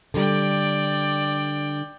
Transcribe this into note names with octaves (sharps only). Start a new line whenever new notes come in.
D3 G3 D5 G5